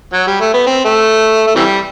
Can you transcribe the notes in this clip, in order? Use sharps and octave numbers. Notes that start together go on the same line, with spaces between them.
F#3
G3
A3
B3
C4
A3
A3
C3 E3 G3